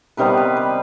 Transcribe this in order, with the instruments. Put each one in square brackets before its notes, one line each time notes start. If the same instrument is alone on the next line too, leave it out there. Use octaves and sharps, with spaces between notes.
[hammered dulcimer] C3 D#3 G3 B3 B4
B4
B4